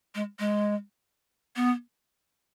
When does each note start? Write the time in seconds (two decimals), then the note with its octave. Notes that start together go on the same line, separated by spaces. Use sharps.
0.15 G#3
0.39 G#3
1.56 B3